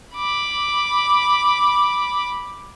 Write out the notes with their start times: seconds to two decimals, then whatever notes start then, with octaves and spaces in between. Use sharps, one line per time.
0.15 B5 D6